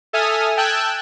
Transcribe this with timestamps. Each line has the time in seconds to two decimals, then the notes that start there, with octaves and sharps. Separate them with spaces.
0.13 A4 E5 G#5 D#6 F6
0.57 G5 A5 E6 F#6 G#6